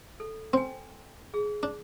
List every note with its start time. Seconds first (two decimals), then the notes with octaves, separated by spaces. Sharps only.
0.20 A4
0.53 C4 G5 G#5
1.34 G#4
1.63 D4